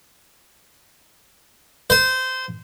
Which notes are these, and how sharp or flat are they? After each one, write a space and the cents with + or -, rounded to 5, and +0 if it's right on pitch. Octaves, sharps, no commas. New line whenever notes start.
C5 -20